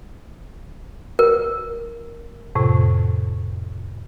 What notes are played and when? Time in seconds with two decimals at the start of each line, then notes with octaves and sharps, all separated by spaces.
1.19 A#4
2.55 F2 A2 C3